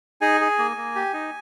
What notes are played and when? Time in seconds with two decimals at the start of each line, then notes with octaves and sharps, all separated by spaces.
0.21 D#4 G#4 G#5
0.41 G#4
0.59 A#3
0.77 A#3
0.95 G4
1.13 D#4